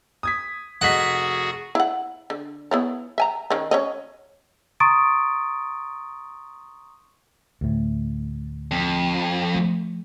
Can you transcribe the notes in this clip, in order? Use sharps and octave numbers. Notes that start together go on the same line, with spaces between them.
D#6 G#6 B6
F1 F#4 G#4 D#5 F#5 B6
E4 F#5
D3
B3 E4 C#5
E5 G#5 A#5
D#3 C#4
C#4 C#5 D#5
A#5 C6 C#6 D#6 A6 D7
D2 A2
F2
F3 A3